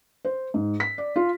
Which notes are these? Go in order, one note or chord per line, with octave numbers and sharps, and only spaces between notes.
C5
G#2
B6
D5
F4